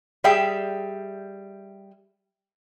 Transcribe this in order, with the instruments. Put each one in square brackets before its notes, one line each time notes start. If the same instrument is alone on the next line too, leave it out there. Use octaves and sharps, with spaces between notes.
[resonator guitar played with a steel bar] G3 G#4 E5 G5